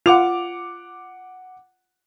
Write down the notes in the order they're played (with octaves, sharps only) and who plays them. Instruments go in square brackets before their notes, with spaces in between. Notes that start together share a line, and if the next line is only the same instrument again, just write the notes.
[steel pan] F4 [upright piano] F#5 D6 F7